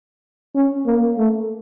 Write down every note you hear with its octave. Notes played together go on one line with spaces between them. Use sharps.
C#4
A#3
A3